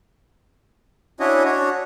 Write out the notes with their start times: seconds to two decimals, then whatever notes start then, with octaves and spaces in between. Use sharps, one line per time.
1.20 C#4 D4 E4 F#4 C#5 D#5
1.45 D4 F#4 C#5